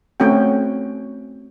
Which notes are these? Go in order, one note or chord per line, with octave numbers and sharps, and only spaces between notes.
A3 C4 C#4 F#4 G5